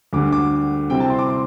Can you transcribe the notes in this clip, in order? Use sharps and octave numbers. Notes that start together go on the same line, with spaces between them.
D2 D3 G3 D6
D6
C3 G3 C4 E4 G5
A5
C6
D6
C6